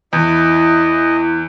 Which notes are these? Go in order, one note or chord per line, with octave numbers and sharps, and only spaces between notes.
E2 E4 D#5